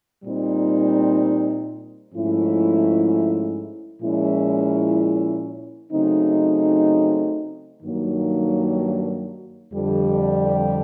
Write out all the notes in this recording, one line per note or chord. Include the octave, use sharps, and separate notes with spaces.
A#2 G3 C4 D#4
G#2 F3 A3 C#4 E4
A#2 F3 G#3 C#4 E4
C#3 F#3 A3 C4 D#4
G2 D#3 F#3 A#3 D#4
F2 D3 G3